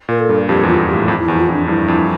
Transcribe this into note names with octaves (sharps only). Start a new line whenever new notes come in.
A#2 A#4
A4
G2
F2 G4
E2
F4
F2
G4
A2
F2 E4
E4
E2
F4
F2
D4
G2 E4
F2